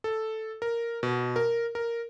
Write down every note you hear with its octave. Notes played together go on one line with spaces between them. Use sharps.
A4
A#4
B2
A#4
A#4